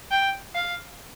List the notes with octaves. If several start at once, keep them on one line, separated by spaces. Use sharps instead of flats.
G5
F5